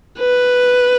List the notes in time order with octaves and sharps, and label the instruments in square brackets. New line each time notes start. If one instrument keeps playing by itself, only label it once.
[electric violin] B4